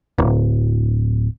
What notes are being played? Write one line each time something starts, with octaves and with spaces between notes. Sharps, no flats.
D1